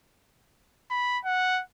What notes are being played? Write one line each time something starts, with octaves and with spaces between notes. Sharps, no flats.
B5
F#5